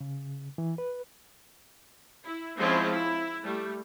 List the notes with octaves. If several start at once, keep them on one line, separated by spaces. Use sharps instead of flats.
C#3
E3
B4
E4
F3 G#3 C4 C#4 E4 F4
E4
G3 A3